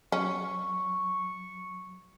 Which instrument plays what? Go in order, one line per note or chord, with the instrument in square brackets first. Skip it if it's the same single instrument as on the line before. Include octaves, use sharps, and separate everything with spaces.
[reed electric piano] F#3 [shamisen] C#4 [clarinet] C#6